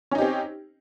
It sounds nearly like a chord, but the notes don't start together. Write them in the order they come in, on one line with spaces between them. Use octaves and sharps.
C#4 D#4 G4 C4